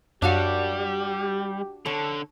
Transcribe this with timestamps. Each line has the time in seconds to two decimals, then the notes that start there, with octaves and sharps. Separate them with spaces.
0.22 F#2 G3 D4 F#4 G4 F5
1.86 D3 A4 C#5